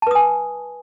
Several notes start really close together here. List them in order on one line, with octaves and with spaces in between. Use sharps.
A5 B4 D#6 G#5